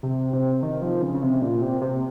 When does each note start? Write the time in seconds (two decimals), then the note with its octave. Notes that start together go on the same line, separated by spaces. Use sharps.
0.03 C3
0.33 C3
0.63 D#3
0.82 F3
1.02 C#3
1.14 C#3
1.23 C3
1.42 A#2
1.62 C3
1.81 C3